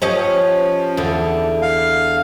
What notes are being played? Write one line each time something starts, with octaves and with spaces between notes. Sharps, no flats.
F3 C#4 G4 D#5
E2 D3
F5